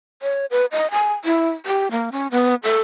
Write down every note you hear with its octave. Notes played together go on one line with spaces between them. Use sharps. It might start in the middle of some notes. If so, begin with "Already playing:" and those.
C#5
B4
D#5
G#5
E4
G4
A#3
C#4
B3
A4